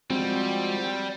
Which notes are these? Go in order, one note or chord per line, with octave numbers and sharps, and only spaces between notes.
F3 G3 G#3 C4 F#4